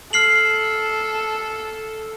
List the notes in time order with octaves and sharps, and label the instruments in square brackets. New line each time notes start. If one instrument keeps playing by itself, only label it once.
[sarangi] A4 [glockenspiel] F6 C7 F#7